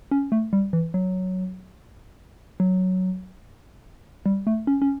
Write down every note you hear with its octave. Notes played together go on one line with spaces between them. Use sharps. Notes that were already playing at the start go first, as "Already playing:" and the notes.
C#4
A3
G3
E3
F#3
F#3
G3
A3
C#4
C#4